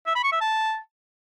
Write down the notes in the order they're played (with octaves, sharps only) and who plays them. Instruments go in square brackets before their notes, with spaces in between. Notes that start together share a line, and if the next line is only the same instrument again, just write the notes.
[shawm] E5
B5
C#6
E5
A5